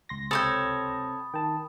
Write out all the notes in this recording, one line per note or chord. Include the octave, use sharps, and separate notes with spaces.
C#2 C6 A#6
C3 C4 A4 C#5 G5 B5 D#6 A6
D#3 G5 A5